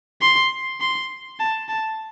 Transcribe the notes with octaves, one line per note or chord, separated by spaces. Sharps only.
C6
C6
A5
A5